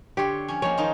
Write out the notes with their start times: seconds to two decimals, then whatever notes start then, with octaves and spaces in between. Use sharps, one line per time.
0.17 D3 G4 C#5 C6
0.48 F3 C#4
0.62 F3 G#3 A#3 C#5
0.78 D#3 D#4 F4